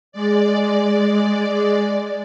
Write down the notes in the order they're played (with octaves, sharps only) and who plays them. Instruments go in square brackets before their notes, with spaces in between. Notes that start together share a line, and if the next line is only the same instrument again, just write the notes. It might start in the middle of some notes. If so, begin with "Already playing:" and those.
[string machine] G#3 D5